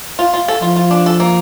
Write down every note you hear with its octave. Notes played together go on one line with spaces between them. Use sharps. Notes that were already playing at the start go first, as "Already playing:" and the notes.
F4
F4
A4
F3 F4
F4
D4
A4
A#3